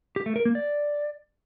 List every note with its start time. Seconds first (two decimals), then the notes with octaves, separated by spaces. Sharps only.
0.16 G4
0.26 A3
0.36 A#4
0.45 A#3
0.55 D5